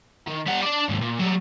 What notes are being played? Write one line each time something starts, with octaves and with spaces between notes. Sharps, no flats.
D#3
G3 F#5
D4 D5
D#2 G#2
A#2
F#3 G3